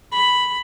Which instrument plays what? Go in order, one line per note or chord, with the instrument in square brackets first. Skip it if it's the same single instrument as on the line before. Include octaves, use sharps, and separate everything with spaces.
[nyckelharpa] B5